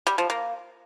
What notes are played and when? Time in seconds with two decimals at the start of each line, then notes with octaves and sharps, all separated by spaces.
0.07 G3
0.18 F3
0.30 A#3